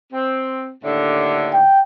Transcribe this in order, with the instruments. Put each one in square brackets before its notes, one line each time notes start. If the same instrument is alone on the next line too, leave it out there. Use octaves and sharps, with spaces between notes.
[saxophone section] C4
D#2 A2 D3
[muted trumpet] G5